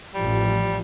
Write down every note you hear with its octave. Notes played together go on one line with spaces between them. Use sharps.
A1 F3 G3